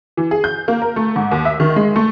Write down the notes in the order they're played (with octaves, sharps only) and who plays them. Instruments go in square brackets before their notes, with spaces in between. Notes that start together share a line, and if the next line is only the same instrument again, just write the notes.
[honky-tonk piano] E3
G#4
G6
A#3
A#4
A3
G#2
D#2
E5
D#3
G#3
A3